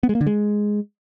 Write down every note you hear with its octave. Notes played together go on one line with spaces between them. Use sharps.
B3
G#3
A#3
D3
G#3